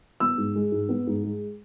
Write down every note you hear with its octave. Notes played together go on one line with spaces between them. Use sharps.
B3 E6
G#2
G#3
G#2
B3
G#2
G#3